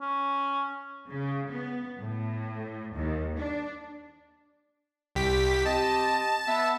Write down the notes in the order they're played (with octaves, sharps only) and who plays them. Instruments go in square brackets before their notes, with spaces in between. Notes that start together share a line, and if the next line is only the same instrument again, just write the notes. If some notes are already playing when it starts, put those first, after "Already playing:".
[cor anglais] C#4
[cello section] C#3
B3
A2
D#2
D4
[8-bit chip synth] C2 G4 B6
[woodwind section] C4 G4 D#5 [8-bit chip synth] A5
[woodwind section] B3 E5